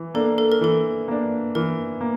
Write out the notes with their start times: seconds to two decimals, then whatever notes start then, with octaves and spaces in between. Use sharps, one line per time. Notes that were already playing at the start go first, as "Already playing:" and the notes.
Already playing: E3
0.14 A#3 D4 A4
0.38 A4
0.52 A#4
0.61 E3 A4
1.08 A#3 D4
1.55 E3 A#4
2.01 A#3